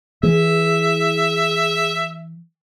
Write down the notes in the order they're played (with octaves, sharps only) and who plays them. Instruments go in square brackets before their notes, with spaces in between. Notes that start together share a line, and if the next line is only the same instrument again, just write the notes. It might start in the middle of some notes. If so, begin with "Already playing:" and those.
[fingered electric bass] E3 [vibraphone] G#4 [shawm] E5